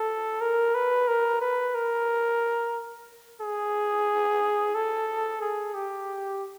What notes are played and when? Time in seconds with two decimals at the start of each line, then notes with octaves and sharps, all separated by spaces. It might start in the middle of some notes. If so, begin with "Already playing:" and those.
Already playing: A4
0.41 A#4
0.74 B4
1.08 A#4
1.41 B4
1.75 A#4
3.41 G#4
4.75 A4
5.41 G#4
5.74 G4